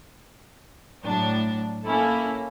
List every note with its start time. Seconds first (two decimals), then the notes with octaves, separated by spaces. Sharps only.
1.04 A2 F#3 D4
1.85 A#3 C#4 E4 A4